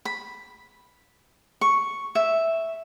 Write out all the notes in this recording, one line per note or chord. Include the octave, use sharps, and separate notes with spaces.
B5
C#6
E5